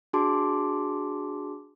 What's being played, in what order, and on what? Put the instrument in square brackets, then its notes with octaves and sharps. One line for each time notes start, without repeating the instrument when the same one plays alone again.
[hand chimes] D4 F#4 G#4 A5 C6 D6